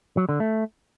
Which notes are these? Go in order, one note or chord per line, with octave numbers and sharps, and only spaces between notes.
F#3
D3
A3